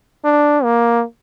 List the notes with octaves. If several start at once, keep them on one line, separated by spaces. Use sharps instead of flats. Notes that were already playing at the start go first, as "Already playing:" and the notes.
D4
A#3